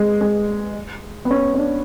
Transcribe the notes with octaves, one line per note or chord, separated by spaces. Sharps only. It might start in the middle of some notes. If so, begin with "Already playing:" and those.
Already playing: G#3
G#3
B3
C#4
C#4
D4